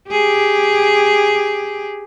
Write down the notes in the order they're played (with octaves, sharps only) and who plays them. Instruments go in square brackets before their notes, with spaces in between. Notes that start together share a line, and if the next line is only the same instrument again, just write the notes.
[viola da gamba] G4 G#4